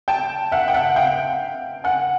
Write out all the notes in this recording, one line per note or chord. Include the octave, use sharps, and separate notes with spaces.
G5 A5
E5 F#5
G5
E5 F#5
F5 G5
F#5 G#5